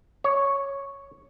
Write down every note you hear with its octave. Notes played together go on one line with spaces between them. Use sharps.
C#5